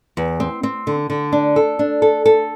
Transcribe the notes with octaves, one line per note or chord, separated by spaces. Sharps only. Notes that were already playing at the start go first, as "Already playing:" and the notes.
E2
C4
C4
D3
D3
D4
A4
D4
A4
A4